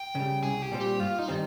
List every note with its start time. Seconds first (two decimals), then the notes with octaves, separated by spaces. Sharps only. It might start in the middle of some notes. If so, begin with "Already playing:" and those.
Already playing: G5
0.15 C#3 G3
0.43 C2 G#4
0.62 G4
0.72 A#2 G3 C4
0.81 G4
1.00 G2 F4
1.19 D#4
1.28 D#3 G3 C4